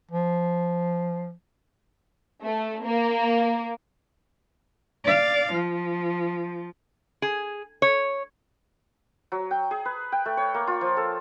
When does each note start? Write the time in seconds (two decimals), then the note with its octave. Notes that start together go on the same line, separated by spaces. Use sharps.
0.11 F3
2.42 A3
2.84 A#3
5.04 D5 F5
5.52 F3
7.22 G#4
7.82 C#5
9.32 F#3
9.51 G5
9.71 G#4
9.85 B4
10.12 G5
10.26 A3
10.37 C#5
10.54 A#3
10.67 F4
10.81 F3
10.97 A4